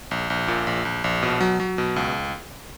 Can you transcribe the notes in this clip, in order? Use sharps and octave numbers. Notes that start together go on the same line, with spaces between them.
A#1
A#1
A#2
A#1
A#1
A#1
B2
F#3
F#3
B2
C#2